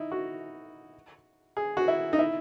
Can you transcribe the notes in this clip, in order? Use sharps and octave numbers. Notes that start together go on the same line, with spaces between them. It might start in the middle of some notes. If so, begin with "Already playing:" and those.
Already playing: D#4 E4
F#4
G#4
F#4
E4
D#4
E4